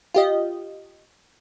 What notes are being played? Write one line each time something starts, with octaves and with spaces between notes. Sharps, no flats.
F4 G4 D#5